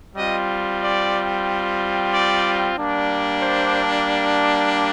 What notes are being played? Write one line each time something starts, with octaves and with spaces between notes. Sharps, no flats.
G3 C4 F4 D#5
D5
D5
G3 A#3 D4
C5